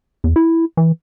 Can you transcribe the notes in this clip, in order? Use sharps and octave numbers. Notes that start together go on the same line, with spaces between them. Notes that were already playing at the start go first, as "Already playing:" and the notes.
E2
E4
E3